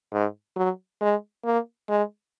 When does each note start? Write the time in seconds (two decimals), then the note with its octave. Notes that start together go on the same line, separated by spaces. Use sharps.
0.12 G#2
0.56 F#3
1.01 G#3
1.45 A#3
1.89 G#3